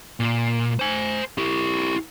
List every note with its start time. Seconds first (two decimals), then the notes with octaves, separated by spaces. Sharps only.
0.20 A#2
0.79 C5 G#5
1.38 E4 G4